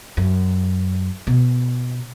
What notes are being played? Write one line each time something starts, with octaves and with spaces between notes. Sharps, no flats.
F#2
B2